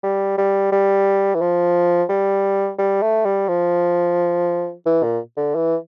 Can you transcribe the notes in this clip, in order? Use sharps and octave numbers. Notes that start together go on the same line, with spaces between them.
G3
G3
G3
E3
F3
G3
G3
A3
G3
F3
E3
A#2
D3
E3